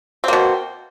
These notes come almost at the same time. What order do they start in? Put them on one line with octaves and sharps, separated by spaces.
C4 A#3 B2